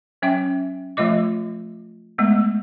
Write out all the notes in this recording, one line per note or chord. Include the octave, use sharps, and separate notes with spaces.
F#3 C#4 E5 G5
F3 A3 F4 D#5 D6
G#3 A3 B3